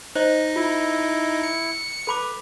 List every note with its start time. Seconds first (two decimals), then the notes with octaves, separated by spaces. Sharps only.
0.15 D#4 C5 D#5
0.56 E4 F4
1.43 C#7
2.07 A4 B4 B5 D6